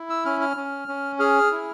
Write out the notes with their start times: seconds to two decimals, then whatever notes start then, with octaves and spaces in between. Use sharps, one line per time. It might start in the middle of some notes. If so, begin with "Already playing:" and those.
Already playing: E4
0.10 E6
0.25 C#4 F6
0.41 F6
0.57 C#4
0.88 C#4
1.19 G#4 F6
1.52 E4